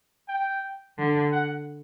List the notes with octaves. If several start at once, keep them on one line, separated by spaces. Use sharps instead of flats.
G5
D3
F#5